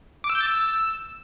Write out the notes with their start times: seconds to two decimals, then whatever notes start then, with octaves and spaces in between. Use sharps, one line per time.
0.24 D6
0.30 E6
0.35 G6
0.40 A6
0.46 E6